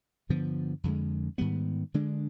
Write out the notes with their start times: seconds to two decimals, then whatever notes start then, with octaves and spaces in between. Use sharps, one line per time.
0.29 G2 D3 F3 B3
0.84 F2 D3 G#3
1.38 G#2 D#3 G3 B3
1.94 D3 G#3 D4